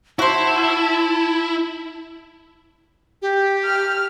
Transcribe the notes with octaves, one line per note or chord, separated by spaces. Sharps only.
E4 F#4 C5 A5
G4
F6